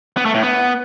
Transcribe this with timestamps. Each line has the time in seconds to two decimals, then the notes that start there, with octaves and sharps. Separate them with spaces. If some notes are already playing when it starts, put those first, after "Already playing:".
0.17 B3
0.25 A3
0.34 A2
0.43 B3